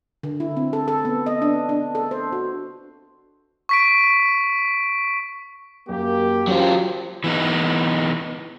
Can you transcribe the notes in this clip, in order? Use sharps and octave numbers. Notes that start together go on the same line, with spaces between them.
D3
E4
C4
A4
A4
B3
D#5
D4
D4
A4
C5
F#4
C#6 B6 D7
F#2 A#3 G4
F#3 C#4 F4 G4 C5
E3 B3 D#4